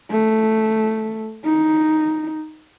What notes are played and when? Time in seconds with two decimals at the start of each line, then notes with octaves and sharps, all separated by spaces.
0.11 A3
1.45 D#4